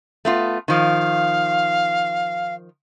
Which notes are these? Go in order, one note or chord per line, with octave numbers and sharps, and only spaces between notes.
A3 B3 F4
D#3 F3 F5